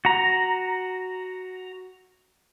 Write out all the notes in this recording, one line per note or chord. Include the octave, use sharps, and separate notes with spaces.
F#4 A#5